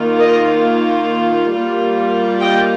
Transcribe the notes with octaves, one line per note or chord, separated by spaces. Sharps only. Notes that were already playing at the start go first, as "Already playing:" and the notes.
Already playing: D#3 A#3 F4
A#4 D#5
G3 A#3 F4
D#5 G5